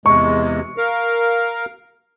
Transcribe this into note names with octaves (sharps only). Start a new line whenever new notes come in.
E2 C3 G#3 C#6
A#4 F5